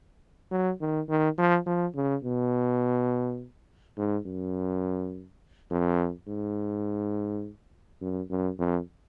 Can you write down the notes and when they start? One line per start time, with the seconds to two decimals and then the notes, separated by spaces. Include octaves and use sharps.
0.51 F#3
0.81 D#3
1.09 D#3
1.38 F3
1.66 F3
1.95 C#3
2.24 B2
3.98 G#2
4.26 F#2
5.71 F2
6.28 G#2
8.01 F#2
8.30 F#2
8.59 F2